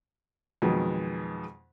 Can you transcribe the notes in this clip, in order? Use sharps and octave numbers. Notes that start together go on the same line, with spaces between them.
F2 B2 D#3 F#3 G#3